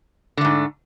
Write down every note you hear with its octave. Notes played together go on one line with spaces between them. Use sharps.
G#2 D3 A3